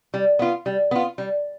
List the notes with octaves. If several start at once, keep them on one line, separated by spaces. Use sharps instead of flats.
G3
B3 F4
G3
B3 F4
G3